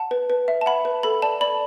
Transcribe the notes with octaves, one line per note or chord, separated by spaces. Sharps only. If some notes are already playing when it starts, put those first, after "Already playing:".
Already playing: F#5 A5
B4
B4
E5
A5
F#5 B5
B4
A4 B5
D5 A5
D5 B5